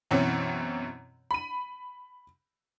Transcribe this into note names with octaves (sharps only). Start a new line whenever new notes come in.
F#2 B2 E3 C4 C#4
B5 D#7